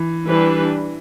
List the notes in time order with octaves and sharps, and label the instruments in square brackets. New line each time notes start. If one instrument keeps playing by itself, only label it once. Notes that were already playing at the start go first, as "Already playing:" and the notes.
Already playing: [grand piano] E3
[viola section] E3 G3 D4 B4